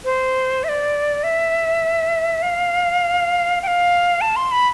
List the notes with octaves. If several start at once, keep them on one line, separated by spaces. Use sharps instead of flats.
C5
E5
D5
E5
F5
G5
F5
A5
C6
B5